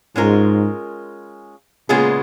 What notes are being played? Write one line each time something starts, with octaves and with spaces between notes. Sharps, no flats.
G#2 G#3 C#4 F4 A#4
A#2 C#3 G#3 B3 F4 G#4